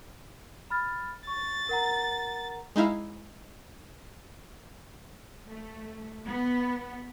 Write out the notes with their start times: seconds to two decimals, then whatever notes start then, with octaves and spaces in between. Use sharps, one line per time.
0.70 B5 F6 A6
1.27 C#6 A6
1.69 A#4 F#5 A#5
2.76 G#3 D#4 E4 F5
5.48 A3
6.25 B3